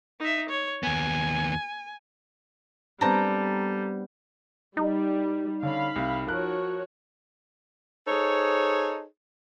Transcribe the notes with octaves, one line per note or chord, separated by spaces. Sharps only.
D#4 E5
C#5
D#2 B3 G#5
G3 B3 C4 D4 A4 A5 A#5
G3 D#4
D3 C#4 F5 B5
C2
F3 F#4 A#4 C#5 F#6
D#4 G#4 A4 C5 C#5